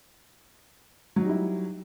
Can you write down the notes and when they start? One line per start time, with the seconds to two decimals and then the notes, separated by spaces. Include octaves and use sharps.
1.16 F#3
1.21 D#4
1.25 G3
1.29 E4